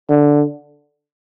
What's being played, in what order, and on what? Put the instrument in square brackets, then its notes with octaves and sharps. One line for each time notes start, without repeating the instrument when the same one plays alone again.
[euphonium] D3